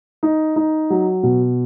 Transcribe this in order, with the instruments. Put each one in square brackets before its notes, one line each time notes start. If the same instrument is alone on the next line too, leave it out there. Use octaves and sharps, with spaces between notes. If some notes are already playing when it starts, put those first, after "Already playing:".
[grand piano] D#4
D#4
F#3
B2